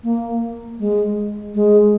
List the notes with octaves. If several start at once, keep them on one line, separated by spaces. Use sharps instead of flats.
A#3
G#3
G#3